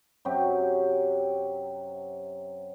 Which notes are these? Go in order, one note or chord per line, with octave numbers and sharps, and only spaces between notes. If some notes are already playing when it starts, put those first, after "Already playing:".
F#2 C3 F#3 G4